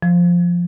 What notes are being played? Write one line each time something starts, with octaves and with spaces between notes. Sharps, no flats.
F3